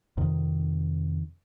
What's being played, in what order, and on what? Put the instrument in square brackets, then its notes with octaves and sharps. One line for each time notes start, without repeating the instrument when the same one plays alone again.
[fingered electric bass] F2 C3 D#3